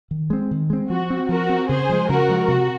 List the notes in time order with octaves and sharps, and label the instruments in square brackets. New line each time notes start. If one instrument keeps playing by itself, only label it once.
[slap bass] D#3
G#3 C4
D#3
G#3 C4
[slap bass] F3 [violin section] F#4
[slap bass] C4
[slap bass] F3 [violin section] F#4 A#4
[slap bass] C4
[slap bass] C#3 [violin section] G#4 C5
[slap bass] F3 G#3
[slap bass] C#3 [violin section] F#4 A#4
[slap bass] F3 G#3
[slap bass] C3 [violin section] F#4